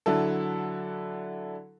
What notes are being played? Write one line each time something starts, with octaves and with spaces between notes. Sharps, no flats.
D3 F#3 D4 E4 A4